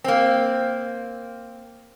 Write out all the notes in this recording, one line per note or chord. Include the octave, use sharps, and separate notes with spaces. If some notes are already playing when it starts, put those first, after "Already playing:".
A#3 C4